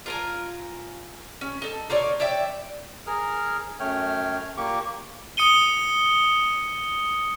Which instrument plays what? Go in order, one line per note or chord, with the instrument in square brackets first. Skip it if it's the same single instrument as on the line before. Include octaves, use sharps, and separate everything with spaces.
[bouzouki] F4 A#4 G#5
C#4
D#4 A4
D#4 F4 C#5 D5
C#5 D5 E5 G5
[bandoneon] G#4 A#4 F6
F#2 A3 C#5 G5 F6
A#2 A#3 G4 C#6 D6
[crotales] D#6 C#7 D#7 G7